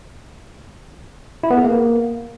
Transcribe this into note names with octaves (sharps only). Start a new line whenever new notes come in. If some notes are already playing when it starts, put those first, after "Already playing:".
E4
B3
G#4
A#3